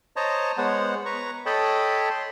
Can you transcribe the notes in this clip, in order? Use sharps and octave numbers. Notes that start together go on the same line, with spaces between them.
C5 C#5 D#5 A5 A#5
G#3 B3 C5 C#5 F#5
B4 A#5 C#6
A4 C#5 D#5 G5 A5 B5
C6